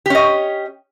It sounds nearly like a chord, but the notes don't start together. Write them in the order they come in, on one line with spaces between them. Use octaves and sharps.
G4 C#4 D#5